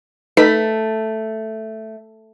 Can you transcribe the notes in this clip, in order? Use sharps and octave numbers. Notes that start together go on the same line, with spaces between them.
A3 D#4 B4 B6